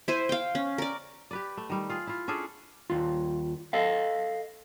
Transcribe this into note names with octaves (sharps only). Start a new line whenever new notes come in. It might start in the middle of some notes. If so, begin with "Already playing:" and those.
E4 C5 G#5
F5 G5
C#4
A#4 D5
G4 B4 D5
A3
D#3 G3
F4 G#4
E4 F4
C#4 D4 G#4 A4
D#2 F4
A4 D#5 F5